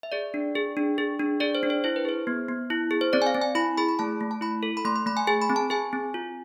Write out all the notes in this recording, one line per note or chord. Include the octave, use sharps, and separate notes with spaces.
E5
G#4 D5
D4
G#4
D4
G#4
D4
G#4 D5
C5
D4
C5
E4 C5
B4
G#4 C5
B3
B3
E4
G#4
C5
C4 D5
G#5
F5
C4
G#5
E4 B5
G#4 B5
B5
A3 A5
A3
A5
E4 B5
A4
B5
A3 C6
C6
A3 B5
G#5
G#4 G#5
B5
C4
A5
G#4 G#5
C4
F4